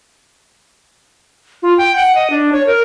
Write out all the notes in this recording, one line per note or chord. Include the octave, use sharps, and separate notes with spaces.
F4
G5
F#5
D#5
D4
C#5
A#4